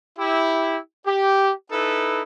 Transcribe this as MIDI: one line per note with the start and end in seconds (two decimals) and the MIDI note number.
0.19 0.78 64
0.19 0.78 67
1.06 1.53 67
1.72 2.23 63
1.72 2.23 64
1.72 2.23 69
1.72 2.23 71